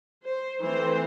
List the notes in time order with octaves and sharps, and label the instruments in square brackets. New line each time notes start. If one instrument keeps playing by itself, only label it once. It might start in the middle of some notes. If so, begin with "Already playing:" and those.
[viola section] C5
E3 A3 C4 C5